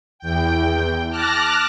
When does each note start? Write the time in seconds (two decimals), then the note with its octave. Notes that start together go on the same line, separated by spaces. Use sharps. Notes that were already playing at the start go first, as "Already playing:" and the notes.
0.19 E2 G5
1.10 A5 D6 F6 F#6 A#6